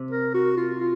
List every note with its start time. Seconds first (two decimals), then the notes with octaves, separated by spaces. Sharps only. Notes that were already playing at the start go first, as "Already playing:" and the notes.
Already playing: C3
0.11 A#4
0.34 F#4
0.57 F4
0.80 F4